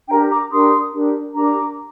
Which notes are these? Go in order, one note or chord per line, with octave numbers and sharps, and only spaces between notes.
D4 G4 A#4 G5 A#5
A#5 D6
D4 G4 A#4 C6 D#6
D4 G4 A#4
D4 G4 A#4 A#5 D6